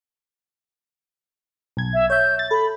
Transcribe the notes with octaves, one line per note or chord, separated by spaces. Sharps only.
B1 G#6
E5
C#5 E5 G6
A6
A4 B5